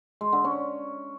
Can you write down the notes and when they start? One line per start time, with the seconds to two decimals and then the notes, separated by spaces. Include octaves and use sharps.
0.21 G#3
0.33 D3
0.44 C#4